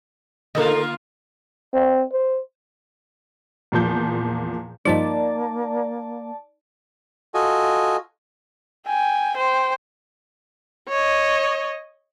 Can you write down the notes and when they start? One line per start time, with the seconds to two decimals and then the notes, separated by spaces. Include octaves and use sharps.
0.55 D3 A#3 D#4 F4 A4 A#4
1.73 C4
2.12 C5
3.72 E2 A#2 F3 G6
4.85 G2 F3 G3 A#3 D#4 D5 D#5 A5
7.34 F4 F#4 A4 D#5 G#5
8.87 G5 G#5
9.37 C5 G5
10.89 C#5 D#5